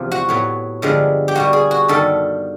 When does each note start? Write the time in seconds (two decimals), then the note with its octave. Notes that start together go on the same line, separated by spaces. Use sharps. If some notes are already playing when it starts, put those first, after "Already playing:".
Already playing: E2 C3 F3
0.12 F#4
0.29 A2 F#3 B3
0.82 G2 D3 F3 G#3 B3
1.28 G4
1.35 B2 G3 A#3 F#4
1.53 G#4
1.71 F#4
1.88 G2 D#3 G3 B3 A4